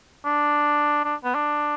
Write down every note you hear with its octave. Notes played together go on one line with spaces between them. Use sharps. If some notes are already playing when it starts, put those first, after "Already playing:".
D4
D4
B3
D4